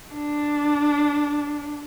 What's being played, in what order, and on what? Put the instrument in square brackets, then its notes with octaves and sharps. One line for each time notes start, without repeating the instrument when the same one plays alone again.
[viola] D4